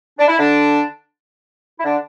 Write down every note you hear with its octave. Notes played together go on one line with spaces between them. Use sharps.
D4
E4
D3 D4
E4
D3 D4